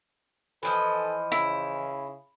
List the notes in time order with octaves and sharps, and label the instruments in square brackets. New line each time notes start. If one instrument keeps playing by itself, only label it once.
[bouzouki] E3 F3 D#5 [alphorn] A4
[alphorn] C#3 [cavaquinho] E4